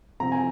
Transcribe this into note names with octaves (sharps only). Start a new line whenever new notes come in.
C3 F3 C4 A#5
G#5